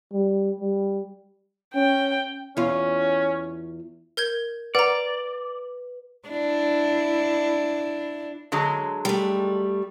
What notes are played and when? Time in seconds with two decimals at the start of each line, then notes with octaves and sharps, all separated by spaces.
0.13 G3
0.61 G3
1.75 C#4 G5
2.57 E2 C#4 F4
4.17 A#4 G6 G#6
4.75 B4 D5 F#5 A#5
6.29 D4 E4
8.52 D3 F#3 G#3
9.05 G3 A3